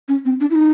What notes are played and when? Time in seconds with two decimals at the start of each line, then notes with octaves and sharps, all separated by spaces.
0.09 C#4
0.25 C4
0.41 D4
0.51 E4
0.55 D#4